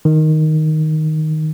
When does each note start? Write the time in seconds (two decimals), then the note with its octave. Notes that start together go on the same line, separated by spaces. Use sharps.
0.05 D#3